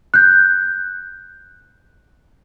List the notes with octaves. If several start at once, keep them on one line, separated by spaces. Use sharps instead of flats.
F#6 G6